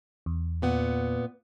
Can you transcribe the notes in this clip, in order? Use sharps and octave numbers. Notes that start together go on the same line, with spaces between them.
E2
A#2 B3 F#5